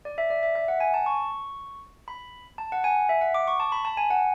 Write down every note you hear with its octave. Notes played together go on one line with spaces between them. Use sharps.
D5
E5
D5
E5
E5
F#5
G#5
A5
C#6
B5
A5
F#5
G#5
E5
F#5
D6
C#6
A5
B5
A5
G#5
F#5